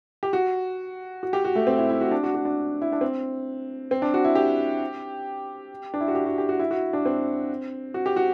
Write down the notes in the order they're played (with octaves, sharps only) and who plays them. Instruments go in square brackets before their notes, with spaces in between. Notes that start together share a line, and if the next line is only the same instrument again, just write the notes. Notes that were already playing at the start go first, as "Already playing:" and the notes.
[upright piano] G4
F#4
F#4
G4
F#4
A3
C4
E4
E4
F#4
D4
F#4
F#4
D4
E4
D4
C4
C4
D4
F#4
E4
G4
D4
E4
F#4
G4
F#4
G4
F#4
E4
F#4
D4
C4
F#4
G4
F#4